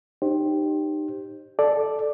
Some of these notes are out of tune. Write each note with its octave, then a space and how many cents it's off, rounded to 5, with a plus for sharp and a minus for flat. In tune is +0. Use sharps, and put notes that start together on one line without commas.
D#4 -25 G4 +0 C5 +25
A4 -10 D5 +5